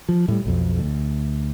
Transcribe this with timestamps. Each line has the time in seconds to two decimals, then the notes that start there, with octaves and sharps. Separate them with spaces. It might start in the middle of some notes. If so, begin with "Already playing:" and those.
0.09 F3
0.28 A2 G3
0.45 B1 F2
0.79 D2